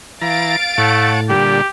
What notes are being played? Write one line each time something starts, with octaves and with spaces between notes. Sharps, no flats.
E3 F5 A#5 A6 D7
A2 A3 C#5 F#5 A5
A#2 D3 G3 G4